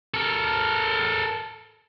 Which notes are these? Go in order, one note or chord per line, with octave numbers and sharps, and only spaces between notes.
A4 A#4